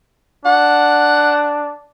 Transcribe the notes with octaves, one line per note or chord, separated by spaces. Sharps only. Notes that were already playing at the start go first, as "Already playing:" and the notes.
D4 F#5